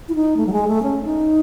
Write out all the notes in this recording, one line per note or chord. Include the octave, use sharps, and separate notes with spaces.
E4
D#4
A3
F#3
G#3
A3
C#4
D#4